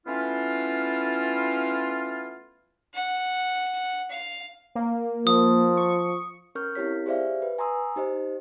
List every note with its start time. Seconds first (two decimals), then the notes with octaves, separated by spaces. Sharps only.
0.06 A3 B3 C#4 E4 F4
2.94 F#5
4.11 F5
4.75 A#3
5.27 F3 D#6
5.77 C#6
6.55 C#4 A#4 C#6 F6 G6
6.75 C4 E4 G4 C#5 B6
7.06 G4 G#4 C5 D5 E5 F5
7.42 B4
7.58 G#5 A#5 C6 D#6 E6
7.96 D#4 G4 C5 D#5